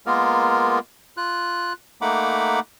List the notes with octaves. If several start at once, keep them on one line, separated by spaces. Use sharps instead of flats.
G#3 A#3 B3 F4 A#4
F4 F#6
A3 A#3 D#4 F#5 B5 D6